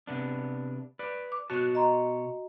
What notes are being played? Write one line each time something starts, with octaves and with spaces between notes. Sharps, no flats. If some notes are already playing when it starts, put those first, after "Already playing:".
C3 B3 D4
B4 D5
D6
B2 F#4 C#5 A5 F#6
D#5 A#5 C6